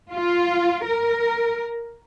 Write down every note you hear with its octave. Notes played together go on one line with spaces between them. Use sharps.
F4
A#4